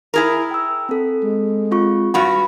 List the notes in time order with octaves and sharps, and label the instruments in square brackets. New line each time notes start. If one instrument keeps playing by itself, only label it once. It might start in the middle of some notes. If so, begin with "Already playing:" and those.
[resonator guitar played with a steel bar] E4 G#4 A#4
[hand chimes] G5 E6
C4 A4
[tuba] G#3
[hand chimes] C4 F4 C#6
[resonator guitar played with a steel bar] G2 F#4 [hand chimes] B5